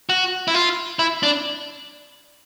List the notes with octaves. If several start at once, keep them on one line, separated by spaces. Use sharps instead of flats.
F#4
E4
F4
E4
D4